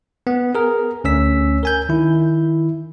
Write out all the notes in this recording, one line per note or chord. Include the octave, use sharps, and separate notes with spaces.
B3
G#4 A#4
D2 C#4 E6 B6
A#4 G#5 G6
D#3 E4